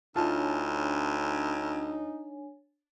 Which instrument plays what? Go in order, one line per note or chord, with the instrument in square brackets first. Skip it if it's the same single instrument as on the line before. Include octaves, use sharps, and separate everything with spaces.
[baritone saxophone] D2 [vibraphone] D4 C#5 G#5 [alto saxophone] D#4 [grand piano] F4 A5